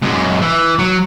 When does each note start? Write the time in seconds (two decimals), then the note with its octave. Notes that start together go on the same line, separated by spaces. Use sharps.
0.03 F#2 G#3
0.41 E3
0.79 F#3